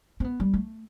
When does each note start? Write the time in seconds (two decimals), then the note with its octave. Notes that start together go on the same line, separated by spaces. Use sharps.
0.20 C4
0.24 B3
0.40 G3
0.54 A3